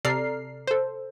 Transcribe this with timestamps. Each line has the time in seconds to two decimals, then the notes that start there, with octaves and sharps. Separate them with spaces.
0.05 C3 A4 D5 A#5 F6 C7
0.68 A4 C5